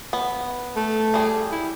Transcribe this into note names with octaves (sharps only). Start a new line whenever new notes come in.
B3
A3
G3 G#4
E4